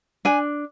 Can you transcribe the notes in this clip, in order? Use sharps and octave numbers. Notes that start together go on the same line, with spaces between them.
D4 G#5